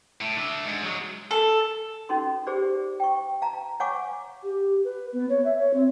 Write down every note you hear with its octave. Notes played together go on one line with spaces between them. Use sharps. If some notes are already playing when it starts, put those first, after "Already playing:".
A2
D4 E5
G#2
F#3 G#3
A4
C#4 D#4 F#4 A4 C6
G4 G#4 C5 D5
G5 C#6
F5 A5 A#5
C#5 F5 F#5 G#5 C#6 D6
G4
B4
B3
C#5
E5
C#5
C4